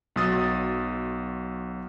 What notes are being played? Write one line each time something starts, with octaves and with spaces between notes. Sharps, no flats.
B1 F#3 D#6 A6